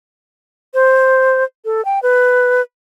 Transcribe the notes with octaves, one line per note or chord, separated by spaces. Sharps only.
C5
A4
G5
B4